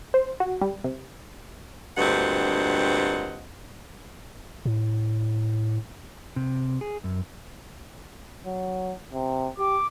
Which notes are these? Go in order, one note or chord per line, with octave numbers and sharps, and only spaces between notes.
C5
F#4
G3
C3
D2 G2 A#2 C4 D#5 F#5
A2
C3
G#4
F#2
F#3
C3
G4 D6